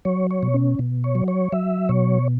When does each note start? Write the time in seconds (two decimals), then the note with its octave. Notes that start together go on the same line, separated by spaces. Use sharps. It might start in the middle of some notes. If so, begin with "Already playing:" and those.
0.05 F#3 C#5
0.31 C#5
0.43 B2
0.54 C#4
0.79 B2
1.04 C#5
1.15 F#3
1.28 C#5
1.52 F#3 E5
1.89 B2 C#5